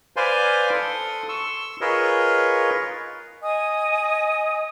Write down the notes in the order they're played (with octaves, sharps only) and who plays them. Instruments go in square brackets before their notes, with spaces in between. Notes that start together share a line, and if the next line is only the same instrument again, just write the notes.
[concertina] B4 C5 D5 F5 G#5 C6
A4 C6 D#6
C6 C#6 E6
F4 G#4 A#4 B4 C#5 D#5
[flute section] D#5 G#5 D#6